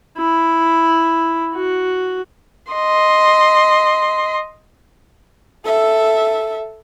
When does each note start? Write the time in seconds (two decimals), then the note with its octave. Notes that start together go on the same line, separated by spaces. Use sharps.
0.18 E4
1.54 F#4
2.73 D#5 C6
5.65 A4 E5